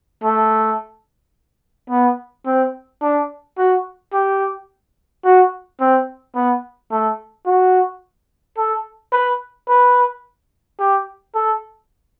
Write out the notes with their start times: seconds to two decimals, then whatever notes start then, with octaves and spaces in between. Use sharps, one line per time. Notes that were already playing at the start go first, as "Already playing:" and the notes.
0.24 A3
1.90 B3
2.46 C4
3.02 D4
3.57 F#4
4.13 G4
5.24 F#4
5.80 C4
6.35 B3
6.91 A3
7.46 F#4
8.57 A4
9.12 B4
9.69 B4
10.79 G4
11.35 A4